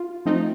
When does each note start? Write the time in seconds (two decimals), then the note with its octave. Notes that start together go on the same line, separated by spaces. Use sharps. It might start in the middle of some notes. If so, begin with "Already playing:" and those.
Already playing: F4
0.26 F3 A3 C4 D#4